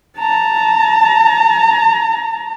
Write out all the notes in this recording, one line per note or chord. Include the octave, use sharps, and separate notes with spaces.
A5 A#5